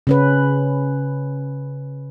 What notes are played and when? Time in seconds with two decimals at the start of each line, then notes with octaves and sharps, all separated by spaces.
0.07 C#3 C#4 B4